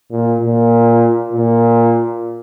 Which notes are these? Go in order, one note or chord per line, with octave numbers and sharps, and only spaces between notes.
A#2
A#2
A#2